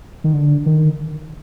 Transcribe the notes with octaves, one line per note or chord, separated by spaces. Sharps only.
D#3
D3
D#3